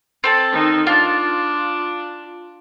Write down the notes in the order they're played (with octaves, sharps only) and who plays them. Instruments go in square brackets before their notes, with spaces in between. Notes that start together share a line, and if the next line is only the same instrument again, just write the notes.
[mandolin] C4 A4 A5
[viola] D#3 D#4
[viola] D4 [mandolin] F4